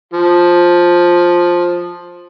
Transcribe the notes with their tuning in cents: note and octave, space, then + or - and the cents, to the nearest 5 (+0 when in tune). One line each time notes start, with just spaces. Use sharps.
F3 +10